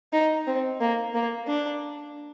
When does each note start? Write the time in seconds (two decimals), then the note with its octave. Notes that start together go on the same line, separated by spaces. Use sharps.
0.13 D#4
0.47 C4
0.80 A#3
1.14 A#3
1.47 D4